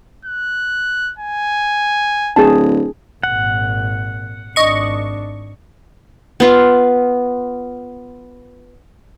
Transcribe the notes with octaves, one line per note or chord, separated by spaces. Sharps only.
F#6
G#5
D1 G#4 A5
G#1 A#2 F#5
G#1 D4 D#5 C#6
B3 F4